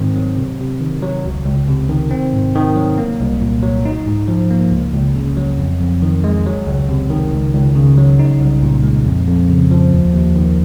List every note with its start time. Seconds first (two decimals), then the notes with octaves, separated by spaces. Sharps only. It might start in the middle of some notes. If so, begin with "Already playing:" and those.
Already playing: G#2 D#3 C4
0.16 F#3
0.37 C3
0.60 C3
0.81 D#3
1.02 F#3
1.25 C#2
1.46 C#2
1.69 C3
1.89 D#3
2.11 C4
2.33 G#2
2.55 D#3
2.76 F#3
2.98 A#3
3.20 C2
3.42 A#2
3.63 F#3
3.85 D#4
4.06 G#2
4.28 F3
4.51 A#3
4.72 C#2
4.94 C#2
5.15 C#3
5.37 F#3
5.58 F2
5.80 F2
6.02 D#3
6.24 G#3
6.46 F#3
6.67 C#2
6.89 C3
7.10 D#3
7.33 C#2
7.53 C#2
7.75 C#3
7.98 F#3
8.19 D#4
8.40 C2
8.62 A#2
8.83 G#3
9.05 F2
9.28 F2
9.49 C#3
9.71 F3
9.92 D#2
10.14 D#2
10.36 D#3